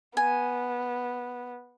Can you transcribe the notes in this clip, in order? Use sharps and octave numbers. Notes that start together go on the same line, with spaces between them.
B3 G#5